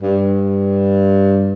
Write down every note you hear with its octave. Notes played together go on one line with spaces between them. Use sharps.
G2